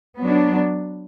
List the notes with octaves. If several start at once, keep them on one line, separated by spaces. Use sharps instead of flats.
F#3 B3 D4